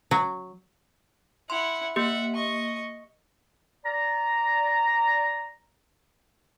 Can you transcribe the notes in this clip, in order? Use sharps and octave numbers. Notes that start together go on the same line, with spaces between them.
F#3
E4 F#5 C6
A#3 G4 E5 F#5
D#5 C#6
D5 A#5